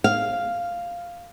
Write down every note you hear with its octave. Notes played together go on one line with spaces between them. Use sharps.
F5